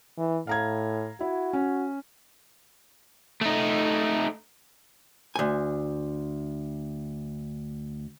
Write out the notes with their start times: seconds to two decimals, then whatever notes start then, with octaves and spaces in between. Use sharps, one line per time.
0.18 E3
0.47 A2 F5 A#5 G#6
1.21 E4 F#4
1.53 C#4
3.41 A3 D#4
5.36 D2 G#5